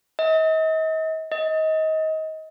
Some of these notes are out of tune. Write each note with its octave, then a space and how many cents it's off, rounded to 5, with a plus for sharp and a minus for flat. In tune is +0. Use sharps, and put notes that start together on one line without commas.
D#5 +40
D#5 +25